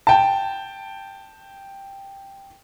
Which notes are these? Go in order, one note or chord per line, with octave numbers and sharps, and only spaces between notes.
G5 A5